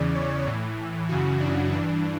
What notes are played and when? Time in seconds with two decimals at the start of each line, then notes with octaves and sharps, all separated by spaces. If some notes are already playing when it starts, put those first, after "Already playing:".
Already playing: E2 C#3 E3 D5
0.15 C#5
0.47 A2 E3
1.09 F#2 C#3 E3 F#4
1.40 D4
1.72 G2 E3 D4